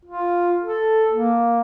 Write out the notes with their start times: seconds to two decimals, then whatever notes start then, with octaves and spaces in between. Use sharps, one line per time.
0.05 F4
0.61 A4
1.11 A#3